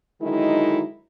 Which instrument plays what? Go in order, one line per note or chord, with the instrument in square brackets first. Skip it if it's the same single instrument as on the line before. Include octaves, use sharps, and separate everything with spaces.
[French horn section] D3 D#3 F#3 G#3 D#4 E4